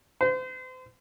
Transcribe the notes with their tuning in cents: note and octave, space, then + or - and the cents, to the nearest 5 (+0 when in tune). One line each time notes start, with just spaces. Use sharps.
C5 -35